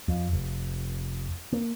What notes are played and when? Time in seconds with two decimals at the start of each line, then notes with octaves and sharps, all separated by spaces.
0.08 F2
0.33 F1
1.52 A#3